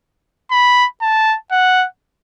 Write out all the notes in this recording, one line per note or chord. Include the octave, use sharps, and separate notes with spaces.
B5
A5
F#5